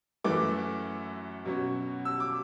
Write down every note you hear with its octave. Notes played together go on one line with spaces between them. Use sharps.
F#2 E3 A3 D6
B2 F#3 C#4
E6
D6